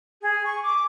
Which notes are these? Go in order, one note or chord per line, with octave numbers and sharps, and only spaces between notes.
G#4
C#6
D6